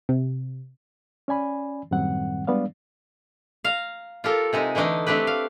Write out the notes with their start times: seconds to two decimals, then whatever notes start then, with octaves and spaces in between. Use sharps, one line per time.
0.09 C3
1.28 C#4 D5 G#5 B5
1.91 F#2 A2 D#3 G3 C4 F#5
2.47 G3 G#3 B3 D4 D5 F5
3.64 F5 A#5
4.24 F4 G4 A4 A#4
4.53 C3 G#3 D#4
4.75 D3 E3 A3 D4 D#4
5.07 A3 C4 D4 G4 B4
5.27 F5